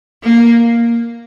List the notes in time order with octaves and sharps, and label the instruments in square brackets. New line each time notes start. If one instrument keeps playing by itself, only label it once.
[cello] A#3